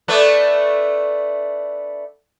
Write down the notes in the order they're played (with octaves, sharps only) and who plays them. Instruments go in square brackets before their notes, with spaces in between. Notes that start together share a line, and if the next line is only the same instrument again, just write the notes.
[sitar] A3 B3 D4